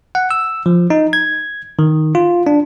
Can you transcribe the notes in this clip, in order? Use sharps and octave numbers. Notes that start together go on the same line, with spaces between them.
F#5
E6
F3
D#4
G#6
D#3
F4
D4